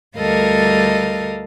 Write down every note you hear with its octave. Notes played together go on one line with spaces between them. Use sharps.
D2 G3 A4 A#4 D#5 F5